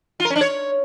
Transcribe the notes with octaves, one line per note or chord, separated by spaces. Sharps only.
F4
A#4
C#4
D4
C#5